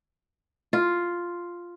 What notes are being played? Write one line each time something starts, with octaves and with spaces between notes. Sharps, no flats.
F4